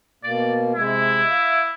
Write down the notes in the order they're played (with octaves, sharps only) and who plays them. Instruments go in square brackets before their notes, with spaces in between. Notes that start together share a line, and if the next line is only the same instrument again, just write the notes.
[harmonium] B2 A#3 [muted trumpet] D5
[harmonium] C3 G#3 [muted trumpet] E4
[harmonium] E5 F5